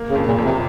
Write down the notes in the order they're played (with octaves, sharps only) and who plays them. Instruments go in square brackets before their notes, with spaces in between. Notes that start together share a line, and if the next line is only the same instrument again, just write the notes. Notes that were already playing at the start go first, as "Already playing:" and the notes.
Already playing: [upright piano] A#3
[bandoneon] C#3
[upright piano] F2
[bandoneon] A#2
[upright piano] F2
[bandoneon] C3